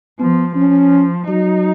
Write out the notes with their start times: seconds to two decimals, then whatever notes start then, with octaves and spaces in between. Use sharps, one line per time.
0.19 F3 B3
0.55 F3 C#4
1.27 F#3 D#4